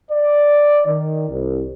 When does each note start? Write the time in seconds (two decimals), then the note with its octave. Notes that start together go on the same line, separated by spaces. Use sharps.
0.11 D5
0.87 D#3
1.29 C2